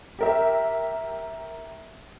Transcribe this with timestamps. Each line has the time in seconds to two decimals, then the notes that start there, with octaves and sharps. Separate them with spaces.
0.19 G4 A#4 E5